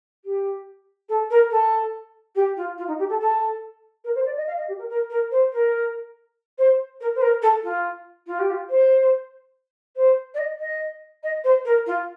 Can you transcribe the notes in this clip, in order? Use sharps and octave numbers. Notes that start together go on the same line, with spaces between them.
G4
A4
A#4
A4
G4
F4
F4
D#4
G4
A4
A4
A#4
C5
D5
D#5
F5
D#5
G4
A#4
A#4
A#4
C5
A#4
C5
A#4
C5
A#4
A4
F4
F4
G4
F4
C5
C5
D5
D#5
D#5
D#5
C5
A#4
F4